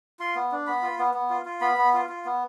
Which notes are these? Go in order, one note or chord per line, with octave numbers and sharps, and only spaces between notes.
F4 C6
B3
D4
B3 B5
F4
B3
B3
F4
F4
B3 B5
B3
F4
F4
B3